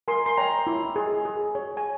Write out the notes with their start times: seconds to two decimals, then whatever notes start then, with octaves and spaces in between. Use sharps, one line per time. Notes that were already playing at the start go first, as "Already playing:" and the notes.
0.08 A#4 G#5 C6
0.26 C6
0.37 C#5 G5 A#5
0.67 E4
0.96 G#4
1.25 G#4
1.55 C#5
1.77 G#5